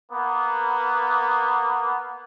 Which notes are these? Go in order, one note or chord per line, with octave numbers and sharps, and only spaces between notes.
A#3 B3